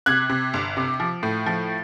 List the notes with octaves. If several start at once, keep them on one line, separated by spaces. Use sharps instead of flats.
C3 F#6 G#6
C3
G1
C3
F3
A2
F3